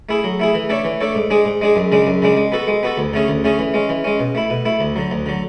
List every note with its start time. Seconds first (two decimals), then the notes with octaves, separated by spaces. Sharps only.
0.09 A3 E4 G#4
0.24 F#3
0.40 A3 E4 G#4
0.55 E3
0.69 A3 D4 A4 C#5
0.85 E3
1.01 A3 D4 A4 C#5
1.15 G#2
1.30 G#3 D4 G#4
1.45 G#2
1.62 G#3 D4 G#4
1.76 F#2
1.92 C#3 G#3 D4
2.07 F#2
2.22 C#3 G#3 D4
2.37 G#3
2.52 B3 F#4 A4
2.68 G#3
2.83 B3 F#4 A4
2.98 D2
3.13 D3 A3 C#4 G#4
3.28 D2
3.44 D3 A3 C#4 G#4
3.59 E3
3.74 G#3 C#4
3.89 E3
4.04 G#3 C#4
4.20 B2
4.35 A3 E4
4.50 B2
4.65 A3 E4
4.81 D2
4.96 D3 F#3
5.11 D2
5.26 D3 F#3